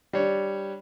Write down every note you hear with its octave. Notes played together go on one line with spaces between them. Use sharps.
G3 D4 C#5